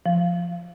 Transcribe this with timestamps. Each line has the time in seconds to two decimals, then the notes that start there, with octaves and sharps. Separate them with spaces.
0.06 F3